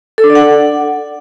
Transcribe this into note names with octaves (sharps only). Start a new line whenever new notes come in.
A4
D4
D5
F#5